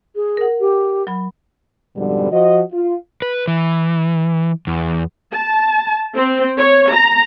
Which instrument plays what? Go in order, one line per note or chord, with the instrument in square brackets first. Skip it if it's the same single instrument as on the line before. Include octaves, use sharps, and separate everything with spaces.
[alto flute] G#4
[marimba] A#4 F#5
[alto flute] G4
[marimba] F#3 B5
[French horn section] F2 G#2 B2 D3 G3
F3 F#4 D#5
F4
[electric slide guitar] B4
E3
E2
[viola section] A5
C4
C#5
A#5